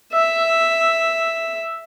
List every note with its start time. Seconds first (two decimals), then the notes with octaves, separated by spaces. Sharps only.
0.13 E5